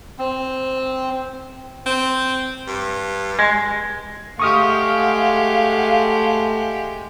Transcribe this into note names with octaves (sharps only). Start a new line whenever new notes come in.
C4
C4
G2
G#3
G#3 A3 G4 F5 F#5 C#6 D#6 F6